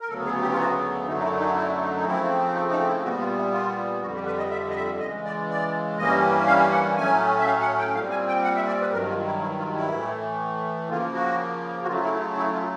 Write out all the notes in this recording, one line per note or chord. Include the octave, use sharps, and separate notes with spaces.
A#4
D2 C#3 F#3 B3 A4
G#4
G4
F4
F#4
F#2 D3 F#3 A3 D#4
D#4
E4
D#4
E4
D#4
D#4
C#3 F3 A3 C4 E4
D#4
D#4
E4
A#2 G3 B3 F#4
F4
E4
F4
F2 D3 G3 F#4
G4
B4
D#5
E5
D#5
E5
C#3 E3 G#3 D#5
D5
D5
G2 E3 G3 A#3 C#4 D#5
F5
F#5
A2 F#3 A3 C#4 G#5
E5
F5
F#5
G5
A#2 G3 C4 F5
G#5
G5
F#5
E5
D5
B4
G2 D#3 F#3 A#4
F4
E4
E4
F4
E4
A2 E3 A3
C#3 F3 A#3 F4
F#4
F#4
C#3 F#3 A3 F4
E4
F4
E4
F4